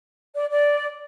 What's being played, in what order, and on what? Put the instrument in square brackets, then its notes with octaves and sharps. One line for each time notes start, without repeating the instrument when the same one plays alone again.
[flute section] D5
D5